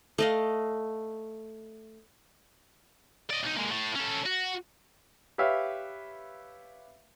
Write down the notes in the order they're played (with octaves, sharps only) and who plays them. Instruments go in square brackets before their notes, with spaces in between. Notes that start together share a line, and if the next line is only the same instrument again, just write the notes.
[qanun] A3 D#5 F5
[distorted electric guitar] D5 D#5
B1 D#4
G#3 A#3
A2 A3
C#4 A4
F#4
[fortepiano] G4 B4 C#5 E5 F5